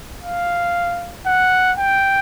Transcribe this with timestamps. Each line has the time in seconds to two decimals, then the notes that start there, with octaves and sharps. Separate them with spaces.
0.23 F5
1.26 F#5
1.78 G5